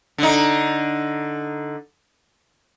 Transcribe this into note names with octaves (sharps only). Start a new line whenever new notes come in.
D3 D#4